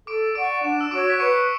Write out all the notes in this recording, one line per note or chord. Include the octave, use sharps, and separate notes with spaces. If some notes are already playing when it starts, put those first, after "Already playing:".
A4 D6 D7
D5 F#5 C#6 D6 D7
D4 E7
E6 E7
F#4 C#5 D6 D7
B6
B4 C#6 C#7